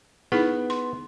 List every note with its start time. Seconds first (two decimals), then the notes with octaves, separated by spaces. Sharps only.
0.32 B3 D#4 E4 G#4
0.70 C6